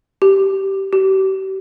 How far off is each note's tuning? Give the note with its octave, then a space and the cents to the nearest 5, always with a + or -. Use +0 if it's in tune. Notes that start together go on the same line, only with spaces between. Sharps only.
G4 -15
G4 -40